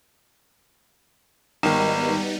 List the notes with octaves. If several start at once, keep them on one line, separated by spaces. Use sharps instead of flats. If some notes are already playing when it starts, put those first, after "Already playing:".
G#1 D#3 G3 B3 D#4